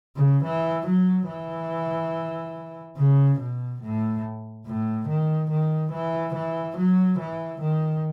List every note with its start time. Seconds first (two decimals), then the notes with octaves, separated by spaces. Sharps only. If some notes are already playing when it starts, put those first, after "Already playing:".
0.16 C#3
0.44 E3
0.86 F#3
1.28 E3
2.97 C#3
3.39 B2
3.82 A2
4.66 A2
5.08 D#3
5.50 D#3
5.92 E3
6.35 E3
6.77 F#3
7.19 E3
7.61 D#3